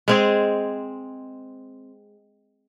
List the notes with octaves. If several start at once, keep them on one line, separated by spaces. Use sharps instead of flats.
G#3 C4 G#4